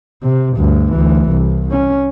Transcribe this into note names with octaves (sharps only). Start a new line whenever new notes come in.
C3
D2 G2
D2 E3
C2
C#4